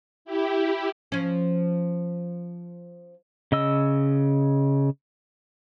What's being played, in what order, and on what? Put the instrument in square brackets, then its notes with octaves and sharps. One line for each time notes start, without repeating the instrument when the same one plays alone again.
[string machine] E4 G4
[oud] F3 C#4
[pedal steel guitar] C#3 D#5 E6